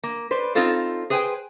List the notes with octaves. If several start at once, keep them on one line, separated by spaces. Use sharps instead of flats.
A#3
B4 C5 D5
C4 D#4 F4 A4 C5
G#4 B4 C5 G5 G#5